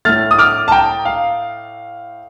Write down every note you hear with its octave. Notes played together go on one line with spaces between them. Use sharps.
A2 A3 F6 A6
D#6
D6 F6
A5
G5 A#5
F5